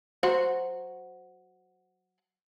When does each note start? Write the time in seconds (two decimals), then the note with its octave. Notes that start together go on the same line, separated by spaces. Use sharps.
0.23 F#3 F#4 C5